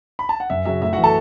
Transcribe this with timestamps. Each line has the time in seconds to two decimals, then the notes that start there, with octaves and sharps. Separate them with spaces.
0.19 B5
0.29 A5
0.40 F#5
0.50 F#2 E5
0.65 C#3 F#3 E5
0.82 A2 E5
0.93 E3 F#4 F#5
1.03 A4 A5